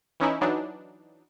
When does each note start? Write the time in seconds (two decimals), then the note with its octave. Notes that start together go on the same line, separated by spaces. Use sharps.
0.20 E3 C#4 D#4 E4
0.41 E3 F#3 D4 D#4